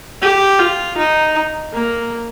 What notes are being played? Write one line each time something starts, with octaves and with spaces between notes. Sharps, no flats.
G4
F4
D#4
A#3